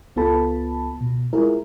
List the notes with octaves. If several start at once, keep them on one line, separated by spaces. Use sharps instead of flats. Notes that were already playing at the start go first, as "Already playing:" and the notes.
C#2 B3 F4 A4 A5 B5
B2
G#3 E4 F4 G#4 A#4